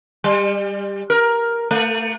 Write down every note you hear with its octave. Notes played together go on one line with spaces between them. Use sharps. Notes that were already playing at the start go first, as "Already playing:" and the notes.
G3
A#4
A3